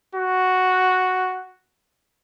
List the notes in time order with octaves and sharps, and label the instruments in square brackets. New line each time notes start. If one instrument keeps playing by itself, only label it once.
[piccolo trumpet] F#4